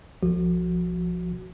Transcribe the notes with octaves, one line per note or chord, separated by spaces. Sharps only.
B1 F3 F#4